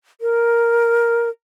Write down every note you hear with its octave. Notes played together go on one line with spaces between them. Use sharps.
A#4